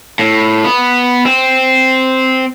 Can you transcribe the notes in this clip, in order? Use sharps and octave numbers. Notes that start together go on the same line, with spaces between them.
A2
B3
C4